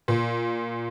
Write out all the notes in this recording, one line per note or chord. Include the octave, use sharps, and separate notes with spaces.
A#2